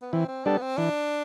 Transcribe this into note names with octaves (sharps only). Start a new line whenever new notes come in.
B3
E3 C4
C4
G3 B3 D4 A4
C4
E3 D4